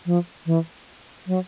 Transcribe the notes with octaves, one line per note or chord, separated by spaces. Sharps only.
F3
E3
F#3